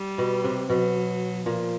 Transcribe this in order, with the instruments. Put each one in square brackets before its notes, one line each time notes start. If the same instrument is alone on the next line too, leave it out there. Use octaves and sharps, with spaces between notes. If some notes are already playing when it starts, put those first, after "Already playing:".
Already playing: [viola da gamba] G3
[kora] B2
C3
[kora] B2 [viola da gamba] F#3
[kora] A#2 [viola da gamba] F3